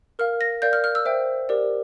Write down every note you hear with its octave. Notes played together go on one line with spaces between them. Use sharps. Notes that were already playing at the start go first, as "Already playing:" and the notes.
A#4 F5 F6
A#6
A#4 D5 F5 G6
F6
F6
E6
C5 E5 G5
G4 A#4 D5